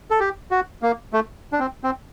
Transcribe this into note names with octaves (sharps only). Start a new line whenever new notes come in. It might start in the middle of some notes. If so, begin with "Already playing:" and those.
A4
G4
F#4
A#3
A3
D4
C4
C4